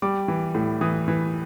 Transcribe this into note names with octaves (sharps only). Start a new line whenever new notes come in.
G3 D6
E3
A2
E3 D#6
E3